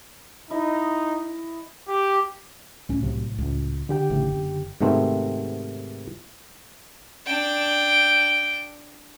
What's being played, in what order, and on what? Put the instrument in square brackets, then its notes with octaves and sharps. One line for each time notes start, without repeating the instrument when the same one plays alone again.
[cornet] D#4 [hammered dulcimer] E4 D#5
[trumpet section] G4
[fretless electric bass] C#2 C#4 [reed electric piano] A2
[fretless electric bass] C2 C3 F#3
C#2
[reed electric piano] D3 G4 G5
[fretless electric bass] A1 C#3 A3
F#1
[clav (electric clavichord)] G#2 C3 D#3 A3 B3 C4
[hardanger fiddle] D4 G5